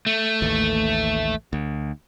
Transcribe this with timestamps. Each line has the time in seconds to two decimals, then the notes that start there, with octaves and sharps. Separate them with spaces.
0.06 A3
0.42 A1 D#2
1.53 D2